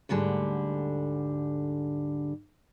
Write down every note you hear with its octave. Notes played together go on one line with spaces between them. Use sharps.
D2 G#2 D3 G3